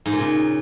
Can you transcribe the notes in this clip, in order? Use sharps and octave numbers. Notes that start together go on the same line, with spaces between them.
G#2
A#2
C#3